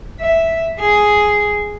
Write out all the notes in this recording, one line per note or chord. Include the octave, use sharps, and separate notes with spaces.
E5
G#4